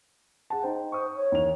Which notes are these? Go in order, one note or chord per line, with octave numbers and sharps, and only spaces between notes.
G#4 F#5 A5
D#4 C5 G5
C5 C#6 D#6
C#5
D#2 E3 F7